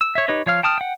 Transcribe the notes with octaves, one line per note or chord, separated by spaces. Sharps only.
E6
C#5 E5
D#4 G4 B4 C#5 D#5
F3 C#5 F5 F6
G5 A5 D#6 F6
F#5 G5